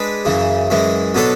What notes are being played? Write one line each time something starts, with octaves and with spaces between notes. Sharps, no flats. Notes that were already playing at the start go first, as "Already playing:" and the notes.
Already playing: G#3 D4 G#4 B4
F#2 C#3 E3
F#2 E3 G#3
B2 F#3 B3 D4 A4